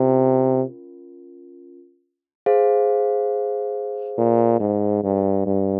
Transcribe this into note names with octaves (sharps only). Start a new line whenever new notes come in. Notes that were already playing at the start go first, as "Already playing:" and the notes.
Already playing: C3 C#4 F4 A#4
G#4 C5 F5
A#2
G#2
G2
G2